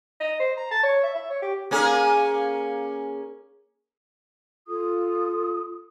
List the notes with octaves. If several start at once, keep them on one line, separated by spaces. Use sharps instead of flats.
D#5
C5
A#5
A5
C#5
E5
E5
C#5
G4
A#3 C#4 G#4
F4 A4 D#6